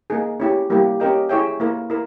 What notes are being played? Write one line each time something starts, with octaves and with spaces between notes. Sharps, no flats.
A#3 D#4 G#4
C#4 E4 G4
G3 A#3 E4 G4
C#4 G4 A#4 D#5 G5
E4 G#4 C#5 E5 G5
A#3 E4 A#4
E4 A#4